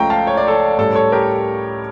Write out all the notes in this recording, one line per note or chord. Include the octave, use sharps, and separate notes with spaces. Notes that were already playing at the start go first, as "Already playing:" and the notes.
Already playing: C#2 C#3 F3 A3 G5 A#5 C#6
F5 A5
C#5
D5
A4 C#5
A2 G3 C#4 A4
A4 C#5
G4 A#4